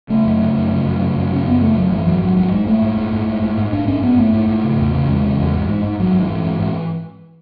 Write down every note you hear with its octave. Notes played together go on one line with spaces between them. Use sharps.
C#3 A3
F#2
C#3
F#2
C#3
F#2
C#3
F#2
C#3 C#4
F#2 B3
C#3 A3
F#2 F#3
G#2 E3
G#2 F#3
G#2 F#3
G#2 F#3
G#2 G#3
G#2 A3
G#2
G#2
G#2
G#2
G#2
G#2
G#2 D4
G#2 C#4
G#2 B3
G#2 A3
G#2
G#2
C#3
E2
C#3
E2 G#3
C#3
E2
G#2
G#2
G#2
G#2 F#3
G#2
E3
G#2
G#2
G#2